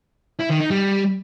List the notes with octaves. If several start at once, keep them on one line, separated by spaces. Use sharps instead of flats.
E4
D#3
D#4
G3